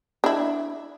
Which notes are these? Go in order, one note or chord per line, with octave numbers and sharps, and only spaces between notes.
D4 E4